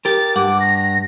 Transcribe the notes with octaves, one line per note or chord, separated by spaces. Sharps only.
G4 A#4 A6
G2 F#5 D6
A#6